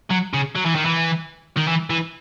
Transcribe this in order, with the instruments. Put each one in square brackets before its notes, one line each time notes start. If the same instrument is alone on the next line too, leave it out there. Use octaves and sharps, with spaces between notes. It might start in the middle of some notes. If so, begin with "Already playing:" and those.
[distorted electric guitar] F#3
C#3
F#3
E3
D#3
E3
D#3
E3
E3